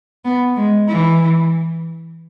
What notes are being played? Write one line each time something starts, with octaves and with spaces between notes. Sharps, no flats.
B3
G#3
E3